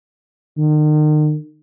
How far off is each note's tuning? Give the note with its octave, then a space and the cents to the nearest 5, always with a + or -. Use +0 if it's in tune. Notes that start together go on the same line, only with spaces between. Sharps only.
D#3 -40